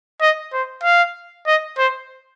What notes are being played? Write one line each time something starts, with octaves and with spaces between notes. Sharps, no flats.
D#5
C5
F5
D#5
C5